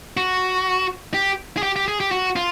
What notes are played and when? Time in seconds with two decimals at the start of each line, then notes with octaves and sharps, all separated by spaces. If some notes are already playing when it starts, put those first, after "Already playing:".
0.17 F#4
1.14 G4
1.57 G#4
1.63 G4
1.76 G4
1.88 G#4
2.00 G4
2.12 F#4
2.36 F4